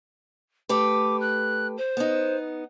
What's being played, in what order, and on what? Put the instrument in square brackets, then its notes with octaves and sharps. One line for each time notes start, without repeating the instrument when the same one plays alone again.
[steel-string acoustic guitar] A3 G4 B4 [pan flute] D6
[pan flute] F#6
C5
[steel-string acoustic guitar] B3 D#4